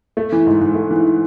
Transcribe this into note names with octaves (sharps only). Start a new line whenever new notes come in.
A3
E3
G#2
G#2
A3
E3